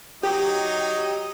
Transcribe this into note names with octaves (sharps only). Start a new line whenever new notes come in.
F#3 D#4 G4 D#5